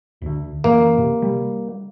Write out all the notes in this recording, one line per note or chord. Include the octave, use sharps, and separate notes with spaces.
D2 D3
F#2 E3 A#3
C3
G3